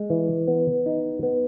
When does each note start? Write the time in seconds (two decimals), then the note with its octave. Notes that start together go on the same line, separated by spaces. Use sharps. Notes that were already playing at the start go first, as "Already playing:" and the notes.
Already playing: G#3
0.10 E3
0.48 B3
0.86 D#4
1.23 B3